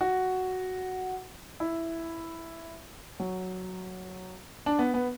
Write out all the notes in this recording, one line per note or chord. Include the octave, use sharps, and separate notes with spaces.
F#4
E4
F#3
D4
B3
B3